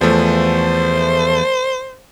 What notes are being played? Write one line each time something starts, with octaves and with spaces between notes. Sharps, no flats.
E2 F3 A3 C5